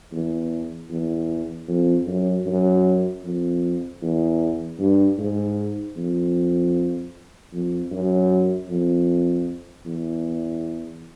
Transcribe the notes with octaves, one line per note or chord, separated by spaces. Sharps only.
E2
E2
F2
F#2
F#2
F2
E2
G2
G#2
F2
F2
F#2
F2
E2